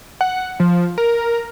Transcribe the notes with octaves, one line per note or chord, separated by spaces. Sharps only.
F#5
F3
A#4